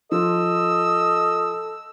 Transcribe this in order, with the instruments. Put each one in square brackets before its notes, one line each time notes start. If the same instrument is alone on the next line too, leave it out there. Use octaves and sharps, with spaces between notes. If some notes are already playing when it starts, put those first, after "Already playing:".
[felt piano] F3 F4 [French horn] A4 [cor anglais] D#5 [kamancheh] E6